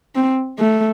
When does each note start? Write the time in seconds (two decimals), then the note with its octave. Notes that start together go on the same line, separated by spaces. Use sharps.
0.15 C4
0.59 A3